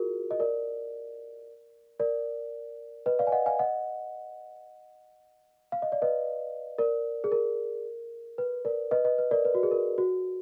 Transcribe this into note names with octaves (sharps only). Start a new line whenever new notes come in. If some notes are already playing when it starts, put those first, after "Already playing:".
Already playing: F4 F#4 G#4 A#4
D#5
A#4 D5
A#4 D5
B4 D#5
D5 F5
G#5
D#5 F#5
F5 G#5
D#5 F#5
F5
D#5
D5
B4 D#5
A#4 D5
G#4
A#4
B4
A#4 D5
B4 D#5
B4 D#5
B4
A#4 D5
B4
F#4
G#4
A#4
F#4